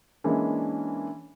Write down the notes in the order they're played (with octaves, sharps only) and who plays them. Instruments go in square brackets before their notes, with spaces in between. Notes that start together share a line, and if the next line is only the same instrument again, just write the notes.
[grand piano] E3 G#3 A#3 C#4 D4